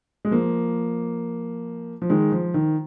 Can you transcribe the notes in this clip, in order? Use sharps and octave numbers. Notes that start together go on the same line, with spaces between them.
G#3
F3 A#3
F3
D#3 G#3
F3
D#3